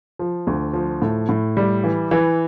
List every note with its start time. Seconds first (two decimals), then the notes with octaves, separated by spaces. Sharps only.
0.19 F3
0.47 D2
0.74 F3
1.02 A2
1.29 A2
1.57 G3
1.84 E3
2.11 E3